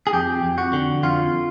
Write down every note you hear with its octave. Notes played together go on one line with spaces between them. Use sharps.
G#4
F2 G4
F2
F#4
D3
F2 F4